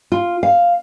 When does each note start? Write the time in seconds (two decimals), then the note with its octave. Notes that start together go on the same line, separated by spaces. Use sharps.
0.12 F4
0.43 F5